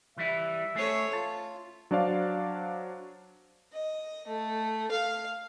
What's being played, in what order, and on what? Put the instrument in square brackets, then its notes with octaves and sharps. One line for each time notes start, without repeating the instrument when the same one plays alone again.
[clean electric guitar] E3 G3 E4 [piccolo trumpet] E5
[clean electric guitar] A3 G#4 [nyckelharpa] A4 C#5
[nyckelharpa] F4 [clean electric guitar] A5
[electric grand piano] F#3 D4 C5 D5 F5
[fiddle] D#5
A3
F5